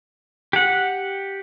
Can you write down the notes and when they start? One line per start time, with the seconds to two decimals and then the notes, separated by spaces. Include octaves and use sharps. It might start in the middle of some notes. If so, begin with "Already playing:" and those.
0.53 G4 F#5